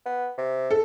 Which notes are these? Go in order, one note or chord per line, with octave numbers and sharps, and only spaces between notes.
B3
C3
A4